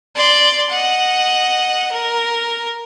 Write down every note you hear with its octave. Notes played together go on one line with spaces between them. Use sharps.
D5 C6
D#5 F#5
A#4